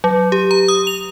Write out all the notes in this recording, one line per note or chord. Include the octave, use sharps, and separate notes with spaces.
F#3
G4
A#5
D#6
F7